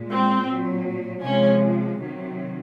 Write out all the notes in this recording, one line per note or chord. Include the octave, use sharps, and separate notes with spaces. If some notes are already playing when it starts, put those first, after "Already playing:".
Already playing: A#2 G#3
C4
A#2 F#3
C3 F3 G#3 C#4
C3 D#3 F#3